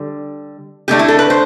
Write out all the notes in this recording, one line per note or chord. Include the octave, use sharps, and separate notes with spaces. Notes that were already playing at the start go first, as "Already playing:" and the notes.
Already playing: D3 G3
D3 A3 D4 G4
E4
A4
B4
C5